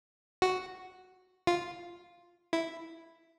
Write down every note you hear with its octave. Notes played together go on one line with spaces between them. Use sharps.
F#4
F4
E4